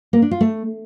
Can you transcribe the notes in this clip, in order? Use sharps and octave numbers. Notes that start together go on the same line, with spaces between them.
A#3
D4
F4
A3